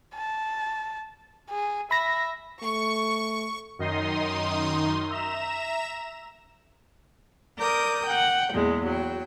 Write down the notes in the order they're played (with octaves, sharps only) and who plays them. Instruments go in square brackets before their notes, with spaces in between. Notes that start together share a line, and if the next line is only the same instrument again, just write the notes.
[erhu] A5
G#4
[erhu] E5 [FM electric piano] B5 A#6
[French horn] A3 [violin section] C#6
[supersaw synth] F#2 D#3 D#4 C6 D#6
E5 A#5 E7
[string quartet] A#4 D5 D6 D#6 G6
F#5 G5
E2 A#2 G#3
F#3 G5